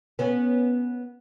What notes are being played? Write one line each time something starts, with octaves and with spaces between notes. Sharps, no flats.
B3 C#4